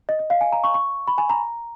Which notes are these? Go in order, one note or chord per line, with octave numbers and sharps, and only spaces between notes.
D#5
D#5
F5
G#5
A#5
C#6
C#6
B5
G#5
A#5